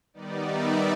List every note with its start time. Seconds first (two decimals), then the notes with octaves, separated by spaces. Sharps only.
0.14 D#3 G3 B3 D#4 D5
0.45 E5